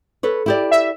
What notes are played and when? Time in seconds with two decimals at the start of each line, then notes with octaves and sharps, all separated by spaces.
0.23 A4 B4 C#5
0.46 E4 G4 D5
0.71 E5